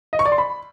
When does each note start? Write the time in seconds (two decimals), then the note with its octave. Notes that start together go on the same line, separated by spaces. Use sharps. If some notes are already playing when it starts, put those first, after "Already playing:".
0.13 D#5
0.19 C#6
0.26 D5
0.32 C6
0.38 B5